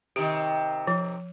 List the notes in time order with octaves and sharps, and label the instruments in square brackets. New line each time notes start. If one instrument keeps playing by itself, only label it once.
[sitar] C3 D#3 [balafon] G4
[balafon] F3